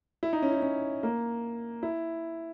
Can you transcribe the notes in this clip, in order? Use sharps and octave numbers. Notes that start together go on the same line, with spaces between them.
E4
D#4
C#4
D#4
C#4
A#3
E4